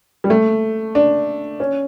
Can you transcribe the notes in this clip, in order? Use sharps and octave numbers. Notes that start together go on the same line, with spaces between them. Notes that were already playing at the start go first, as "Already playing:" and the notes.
G3
A3
D4
C#4